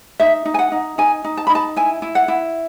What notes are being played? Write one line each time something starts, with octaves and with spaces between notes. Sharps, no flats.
D#4 E5
D#4
G#5
F#5
D#4
D#4 G#5
D#4
A5
B5
D#4
A5
E4 G#5
E4
F#5
E4